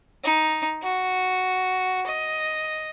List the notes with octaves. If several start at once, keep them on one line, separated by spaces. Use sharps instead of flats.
D#4
F#4
D#5